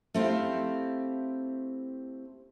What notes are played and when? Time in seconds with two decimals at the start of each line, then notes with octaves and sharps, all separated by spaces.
0.14 A3 C4 E4 G4 F5